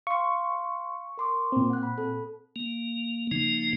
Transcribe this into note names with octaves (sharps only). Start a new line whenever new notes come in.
F5 C6 C#6
A#4 C6 D6
A#2 C4
F#5 F#6
B5
A4
A#3
C#3 F3 A#3 D#4